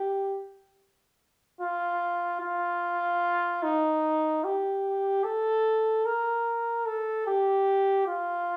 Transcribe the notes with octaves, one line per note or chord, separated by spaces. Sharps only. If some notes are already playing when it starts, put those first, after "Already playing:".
Already playing: G4
F4
F4
D#4
G4
A4
A#4
A4
G4
F4